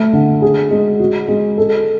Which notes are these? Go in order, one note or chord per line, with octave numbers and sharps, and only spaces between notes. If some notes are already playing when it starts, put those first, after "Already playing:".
Already playing: A3
D3
G#4
G#3
F#4
G#3
A4